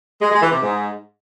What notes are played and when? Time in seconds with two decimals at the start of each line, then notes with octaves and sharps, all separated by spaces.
0.22 G#3
0.32 G#3
0.42 E3
0.52 C3
0.62 G#2